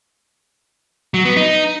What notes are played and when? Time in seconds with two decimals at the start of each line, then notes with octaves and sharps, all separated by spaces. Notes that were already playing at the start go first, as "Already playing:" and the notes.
1.14 F#3
1.25 B3
1.37 D#4